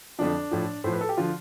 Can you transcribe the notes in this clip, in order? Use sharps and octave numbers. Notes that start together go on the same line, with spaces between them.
F2 D3 F3 D4
A2 F3
A2 F3 C5
B4
A4
G4
D3 F3 F4